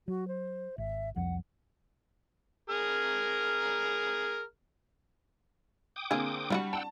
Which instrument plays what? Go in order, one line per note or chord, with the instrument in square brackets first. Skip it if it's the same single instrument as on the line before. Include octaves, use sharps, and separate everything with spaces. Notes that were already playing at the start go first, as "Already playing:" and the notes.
[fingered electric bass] F#3 [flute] F#4
[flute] C5
[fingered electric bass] G#1 [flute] E5
[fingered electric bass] C2 F2 F3 [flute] F#5
[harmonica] G#4 A#4 F6
[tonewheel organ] G5 D6 D#6
[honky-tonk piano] D3 C4 [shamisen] A#3 G#4
[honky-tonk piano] G3 [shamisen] D4 F4 F#4
[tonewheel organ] F#5 G5 E6 [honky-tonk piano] A5